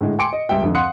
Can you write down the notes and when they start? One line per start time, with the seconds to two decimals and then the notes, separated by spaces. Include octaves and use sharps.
0.01 A2 D3 G#3
0.19 G5 G#5 C6 D6 C#7 D7
0.33 D#5
0.49 C#2 G3 E5 G5
0.62 F2 D3
0.75 F5 F#5 C6 D#6 F#6 C#7